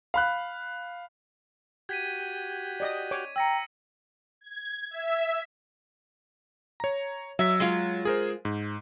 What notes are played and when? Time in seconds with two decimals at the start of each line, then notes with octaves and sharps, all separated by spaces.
0.14 F5 B5 F#6
1.89 F#4 G4 G#6 B6 D#7
2.80 D5 D#5 D#6
3.11 C#5 D6
3.36 G5 A#5 E6 A#6 C#7
4.41 G#6
4.91 E5
6.80 C#5 A#5
7.39 F#3 E5 B6
7.60 G#3 F4
8.05 G#4 A#4 C5
8.45 G#2